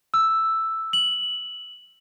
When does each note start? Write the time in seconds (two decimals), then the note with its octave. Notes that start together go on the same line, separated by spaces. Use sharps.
0.14 E6
0.93 F#7